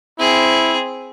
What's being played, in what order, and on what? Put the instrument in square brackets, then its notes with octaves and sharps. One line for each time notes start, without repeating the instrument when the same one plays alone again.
[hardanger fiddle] C4 G#4 [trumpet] E4